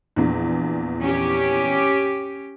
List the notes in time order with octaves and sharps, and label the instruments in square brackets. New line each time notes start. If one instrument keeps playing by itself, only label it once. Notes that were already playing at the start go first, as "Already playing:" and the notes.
[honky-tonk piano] A#1 E2
[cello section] C#4 G4